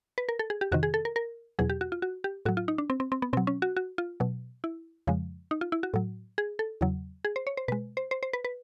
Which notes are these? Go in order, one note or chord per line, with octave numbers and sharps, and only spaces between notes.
B4
A#4
A4
G#4
G4
F2 C3 D#3 F#4
G#4
A4
A#4
A#4
E2 B2 F#3 G#4
G4
F#4
F4
F#4
G4
A2 F#3 F#4
F4
D#4
D4
C4
C4
C4
B3
B2 F#3 C4
C#4
F#4
F#4
F4
B2 F#3
E4
F2 C#3 F3 G#3
D#4
F4
E4
F#4
A2 F#3
G#4
A4
E2 C#3 F#3
G#4
C5
C#5
C5
B2 G#3 B4
C5
C5
C5
B4
B4